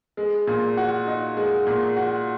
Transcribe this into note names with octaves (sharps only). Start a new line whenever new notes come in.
G#3
A#2
F#4
D#4
G#3
A#2
F#4